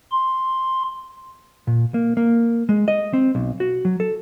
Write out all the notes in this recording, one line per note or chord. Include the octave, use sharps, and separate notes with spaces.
C6
A#2
A#3
A#3
G#3
D#5
C4
B1
F#4
F#3
A4